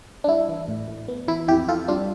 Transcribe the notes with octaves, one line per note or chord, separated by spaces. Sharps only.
D4
G3 E4
E3
A2
A2
B3
E3 E4
F2 E4 G4
F2 F4 A4
G3 D4 F4